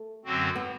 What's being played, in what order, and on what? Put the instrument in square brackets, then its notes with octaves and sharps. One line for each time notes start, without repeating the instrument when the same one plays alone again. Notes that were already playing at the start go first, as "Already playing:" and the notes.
Already playing: [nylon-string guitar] A3
[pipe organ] F#2 D3 F#3 C4 F#4
[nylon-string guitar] B3